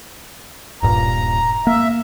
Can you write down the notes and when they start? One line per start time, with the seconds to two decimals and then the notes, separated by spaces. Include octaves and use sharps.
0.83 D#1 G2 A#2 A#5
1.67 A#3 E5